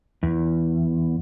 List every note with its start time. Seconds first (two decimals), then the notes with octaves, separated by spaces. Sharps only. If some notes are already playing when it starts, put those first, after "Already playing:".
0.23 E2